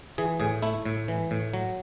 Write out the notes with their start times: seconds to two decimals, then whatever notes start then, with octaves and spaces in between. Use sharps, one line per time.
0.18 E3 G#4
0.40 A2 G#4
0.62 A3 E4
0.85 A2
1.08 E3
1.31 A2
1.54 F#3